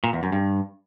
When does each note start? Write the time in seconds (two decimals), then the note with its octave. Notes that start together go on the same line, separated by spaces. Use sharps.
0.04 A#2
0.13 E2
0.23 F#2
0.32 G2